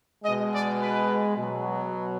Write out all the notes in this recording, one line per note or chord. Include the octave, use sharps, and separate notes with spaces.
B2 G#3 D#5
D5
B4
B2 F#3